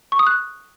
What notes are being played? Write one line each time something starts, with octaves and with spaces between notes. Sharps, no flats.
C#6
D#6
F#6